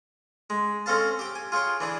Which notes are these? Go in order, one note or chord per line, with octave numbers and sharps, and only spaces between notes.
G#3
C4 C#4 A4 C5 F5 A5
G4 G5
G#5
F4 G#4 C#5 G5
E3 D4 G#4